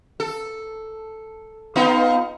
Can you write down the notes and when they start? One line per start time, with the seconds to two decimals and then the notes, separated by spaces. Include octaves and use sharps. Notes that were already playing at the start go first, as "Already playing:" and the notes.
0.20 A4
1.76 B3 D#4 F4